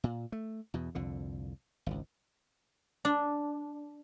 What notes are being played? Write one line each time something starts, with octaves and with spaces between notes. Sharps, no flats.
A#2
A3
E2 B2
C2 F2 D3
G#1 C#2
D4